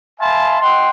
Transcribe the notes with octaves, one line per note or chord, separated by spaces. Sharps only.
E5 F5 G#5 A5 B5 C6
D#5 F#5 G5 C6